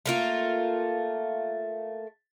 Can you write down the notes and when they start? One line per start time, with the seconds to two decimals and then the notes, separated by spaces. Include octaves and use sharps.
0.06 A3 A#3 F4